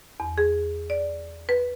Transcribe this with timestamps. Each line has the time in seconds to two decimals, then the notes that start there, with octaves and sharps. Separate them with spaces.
0.20 E2
0.38 G#4
0.90 D5
1.49 B4